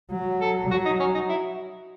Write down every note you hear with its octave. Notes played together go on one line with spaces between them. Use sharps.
F#3
A4
F#3 F#4
D#4
C#4
D#4
E4